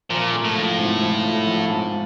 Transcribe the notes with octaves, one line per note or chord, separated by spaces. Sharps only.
A#2 F3
A3
A2
A#1
G#2
F3
A3
A#1
G#2